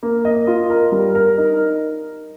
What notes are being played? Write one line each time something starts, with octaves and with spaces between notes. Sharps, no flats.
A#3
D#5
F4
A#4
G3
A#4
D#4